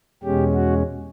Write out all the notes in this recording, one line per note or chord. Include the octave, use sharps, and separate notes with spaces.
E2 B2 G#3 C#4 G4
F#4